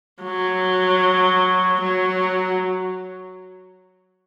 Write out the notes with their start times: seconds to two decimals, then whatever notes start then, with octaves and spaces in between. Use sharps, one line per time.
0.23 F#3
1.81 F#3